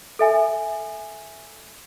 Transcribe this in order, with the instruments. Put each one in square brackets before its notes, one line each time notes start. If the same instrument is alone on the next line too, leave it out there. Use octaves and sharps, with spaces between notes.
[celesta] A4 E5 G#5